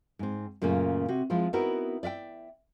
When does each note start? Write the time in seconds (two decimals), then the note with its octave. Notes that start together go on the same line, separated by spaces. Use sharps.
0.19 G#2 C4
0.62 F#2 A#2 C#3 A3 A#3
1.08 C3 F#4
1.30 F3 G#3 C4 E4 F4
1.53 B3 C4 D#4 E4 F#4 A#4
2.03 D5 E5 F5 G5